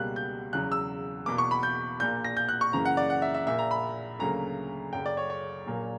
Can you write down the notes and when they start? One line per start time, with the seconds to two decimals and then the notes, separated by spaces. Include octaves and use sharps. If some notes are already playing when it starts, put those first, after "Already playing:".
Already playing: C#2 B2 G3 A#3 F#6
0.16 G6
0.53 E2 C#3 F#3 F#6
0.72 E6
1.26 E2 B2 A#3 D6
1.38 C#6
1.51 B5
1.63 G6
2.00 A#1 A#2 A#3 G6
2.24 A#6
2.37 G6
2.49 F#6
2.61 C#6
2.73 F#2 C#3 E3 A#3 A#5
2.85 F#5
2.97 D5
3.10 F#5
3.22 E5
3.34 E5
3.47 A#1 A#2 A#3 E5
3.59 A#5
3.71 B5
4.19 D2 C#3 F#3 A#3 A#5
4.93 F#1 F#2 C#3 G5
5.06 D5
5.17 C#5
5.30 C#5
5.66 A#1 A#2 F#3 A#3